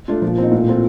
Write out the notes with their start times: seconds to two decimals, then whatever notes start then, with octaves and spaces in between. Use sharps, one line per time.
0.08 A3 D4 F4
0.22 A#2 F3
0.38 C4 D#4
0.52 A2
0.66 A3 C4 F4